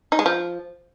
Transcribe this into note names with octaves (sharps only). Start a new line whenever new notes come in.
D#4
G#3
F3